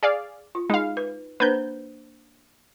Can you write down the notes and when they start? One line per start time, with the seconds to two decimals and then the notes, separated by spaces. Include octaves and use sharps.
0.03 G#4 D5 F5
0.55 F4
0.70 G#3 D#4 F5
0.97 B4
1.40 A#3 D4 B4 C5 G6